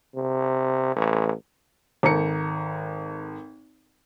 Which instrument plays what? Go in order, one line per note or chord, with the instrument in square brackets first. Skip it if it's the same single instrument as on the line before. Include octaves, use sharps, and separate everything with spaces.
[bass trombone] C3
A1
[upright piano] G#1 A4 A#5 C#7